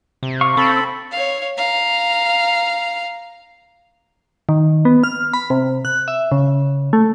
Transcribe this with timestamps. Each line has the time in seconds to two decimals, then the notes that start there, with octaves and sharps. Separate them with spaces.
0.23 C3
0.41 F5 C#6
0.57 C4 A4 B5
1.12 C#5 F5
1.57 F5 A#5
4.49 D#3
4.85 B3
5.04 F6
5.34 B5
5.50 C3
5.85 F#6
6.08 E5
6.32 C#3
6.93 A3